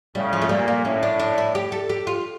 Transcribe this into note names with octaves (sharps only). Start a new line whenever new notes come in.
A2 C#3 G3
F3
A3
A#2 G3
A#3
A2 C#4
D4
D4
E4
G4
A4
G4
F4